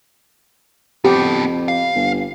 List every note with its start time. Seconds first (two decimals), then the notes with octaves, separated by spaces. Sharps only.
1.05 F2 B3 G4 A4
1.68 F5
1.95 G1